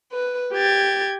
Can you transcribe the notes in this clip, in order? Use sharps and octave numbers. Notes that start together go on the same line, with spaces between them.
B4
G4 G#6 A6